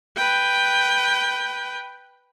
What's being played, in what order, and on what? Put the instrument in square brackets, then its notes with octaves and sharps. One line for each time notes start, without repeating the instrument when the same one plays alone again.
[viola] B4 G5